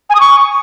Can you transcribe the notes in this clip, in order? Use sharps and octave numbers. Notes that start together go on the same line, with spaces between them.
G#5
D#6
C#6